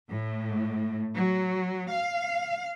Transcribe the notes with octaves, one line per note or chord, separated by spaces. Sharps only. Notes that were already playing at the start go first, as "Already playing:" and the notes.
A2
F#3
F5